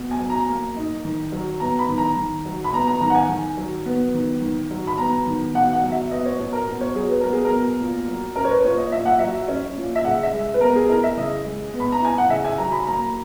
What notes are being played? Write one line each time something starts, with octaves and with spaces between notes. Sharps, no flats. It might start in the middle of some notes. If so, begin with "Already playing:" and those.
Already playing: B2
G#5
F#3
A#5
A#3
D#4
D#3
F#3
B3 A#5
B5
D#3
A#5
D#3
F#3
B5
B3 A#5
A#5
D#3 A#5
F#5
G#5
D#3
F#3
B3
D#3
D#3
F#3
B5
B3 A#5
D#3
B2 F#5
F#5
F#3
E5
B3 D#5
C#5
B2
A#4
B2
C#5
F#3 G#4
B4
B3 A#4
G#4
A#4
B2
A#2
F#3
C#4 A#4
C#5
B4
A#2 C#5
D#5
A#2 E5
F#5
F#3 E5
C#4
A#2
E5
C#3 F#5
E5
G#3
B4
B3 A#4
G#4
E4 A#4
E5
C#3 D#5
G#3
B3
B5
A#5
E4 G#5
F#5
C#3 E5
G#5
F#3 A#5
B5
A#3 A#5